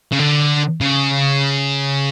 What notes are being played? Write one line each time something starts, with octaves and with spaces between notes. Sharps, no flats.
C#3
D3
C#3